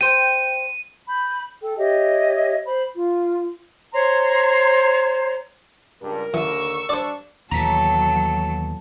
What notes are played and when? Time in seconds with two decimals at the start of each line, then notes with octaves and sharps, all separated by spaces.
0.01 C5 G5 D#7
1.09 B5 G6
1.61 A4 G5
1.78 G4 C#5 D#5 E5
2.65 C5 B5
2.94 F4
3.94 C5 C#5 A#5 C6
6.02 C#2 G2 A#4
6.34 D#2 D3 E3 C#6 E6
6.89 G2 D4 C5 D5
7.51 D#2 B2 E3 F#3 A4 A#5 B6